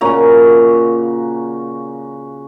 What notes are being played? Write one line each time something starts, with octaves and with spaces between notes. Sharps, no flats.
A#2 C#3 F#4 A#5